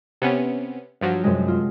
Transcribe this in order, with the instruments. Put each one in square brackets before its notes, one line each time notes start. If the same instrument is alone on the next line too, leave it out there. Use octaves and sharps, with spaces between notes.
[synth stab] C3 B3 C#4
G2 F3 F#3
[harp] F#2 C3 G#3
F4